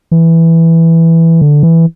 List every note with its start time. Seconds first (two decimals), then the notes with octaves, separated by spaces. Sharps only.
0.11 E3
1.41 D3
1.63 E3